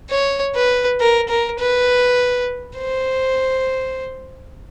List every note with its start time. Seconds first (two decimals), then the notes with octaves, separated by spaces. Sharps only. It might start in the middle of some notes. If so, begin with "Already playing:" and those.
0.10 C#5
0.55 B4
1.00 A#4
1.29 A#4
1.59 B4
2.78 C5